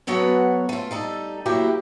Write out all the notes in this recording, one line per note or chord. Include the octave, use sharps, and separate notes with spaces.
B2 F#3 B3 A4 C#5 F#5
A3 F4
G3 D#4 A4
F#3 A#3 E4 G4